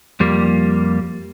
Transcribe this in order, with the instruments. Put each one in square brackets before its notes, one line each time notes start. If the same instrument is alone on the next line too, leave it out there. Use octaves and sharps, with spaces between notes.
[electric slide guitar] F2 G3 A#3